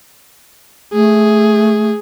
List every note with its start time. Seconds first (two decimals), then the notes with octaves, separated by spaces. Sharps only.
0.93 A3 G#4